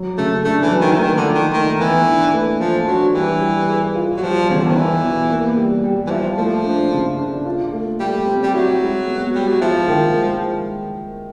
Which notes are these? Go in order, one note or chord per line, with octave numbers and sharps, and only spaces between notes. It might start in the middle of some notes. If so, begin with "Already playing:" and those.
Already playing: F#3
C#3 A3
A3 D4
E3
F#3
D#3
E3
D#3 A3
D3
F3
D#3
D#3 A3
E2 E3
D4
A3
F3 A3
F#3 D4
E3 G3
G3
G#4
F4
F#3
F3 G3
E2 C#3
D3
D#3
E2 E3
B2
A#3
G3
G3
E3
F3 E4
F3 A3
D4
C#3
D4
F4
A3
G3 A3
C4
G3
F#3 E4
G#3
B3
G3 G#3
F#3
F3 E4
D#3
G#3